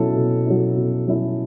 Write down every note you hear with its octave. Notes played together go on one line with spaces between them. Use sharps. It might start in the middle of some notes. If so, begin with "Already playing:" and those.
Already playing: B2 F#3 C#4 E4 A4
B2
F#3 C#4 E4
B2
F#3 C#4 E4